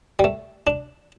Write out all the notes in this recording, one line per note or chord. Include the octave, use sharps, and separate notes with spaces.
G3
A3
D4